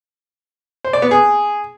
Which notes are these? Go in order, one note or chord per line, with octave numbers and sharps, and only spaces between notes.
C5
D5
B3
G#4